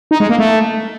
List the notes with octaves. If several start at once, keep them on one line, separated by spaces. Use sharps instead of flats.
D#4
G#3
A#3
A3